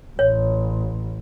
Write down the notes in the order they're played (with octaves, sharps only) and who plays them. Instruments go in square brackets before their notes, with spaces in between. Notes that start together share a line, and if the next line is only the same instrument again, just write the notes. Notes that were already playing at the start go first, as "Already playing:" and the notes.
[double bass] A1 [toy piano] C#5